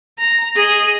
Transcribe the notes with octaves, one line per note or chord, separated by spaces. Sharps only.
A#5
G#4 D#5